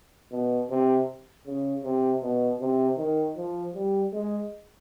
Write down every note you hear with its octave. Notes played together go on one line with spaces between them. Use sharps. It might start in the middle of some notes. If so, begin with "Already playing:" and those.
B2
C3
C#3
C3
B2
C3
D#3
F3
G3
G#3